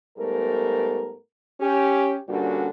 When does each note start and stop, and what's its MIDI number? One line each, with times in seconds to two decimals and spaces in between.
0.17 1.14 44
0.17 1.14 55
0.17 1.14 57
0.17 1.14 59
0.17 1.14 70
1.61 2.15 61
1.61 2.15 67
2.29 2.68 43
2.29 2.68 46
2.29 2.68 50
2.29 2.68 55
2.29 2.68 61
2.29 2.68 66